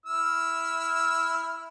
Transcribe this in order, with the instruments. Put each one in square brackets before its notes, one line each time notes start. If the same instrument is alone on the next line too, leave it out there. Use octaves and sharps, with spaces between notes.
[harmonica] E4 E6 F6